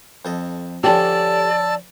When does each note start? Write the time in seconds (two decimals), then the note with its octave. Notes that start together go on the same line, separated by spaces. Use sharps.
0.25 F2 A4 D#5
0.84 D3 F3 C#4 G4 A4 D5 A5 E6